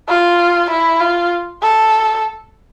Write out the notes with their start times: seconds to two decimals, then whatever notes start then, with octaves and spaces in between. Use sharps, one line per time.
0.09 F4
0.70 E4
1.00 F4
1.62 A4